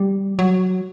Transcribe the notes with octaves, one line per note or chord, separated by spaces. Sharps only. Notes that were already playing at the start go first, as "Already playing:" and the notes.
Already playing: G3
F#3